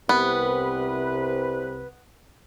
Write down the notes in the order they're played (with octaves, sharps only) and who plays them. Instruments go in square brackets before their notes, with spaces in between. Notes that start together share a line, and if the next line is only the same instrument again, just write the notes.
[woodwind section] C2 C3 B4 [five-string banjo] B3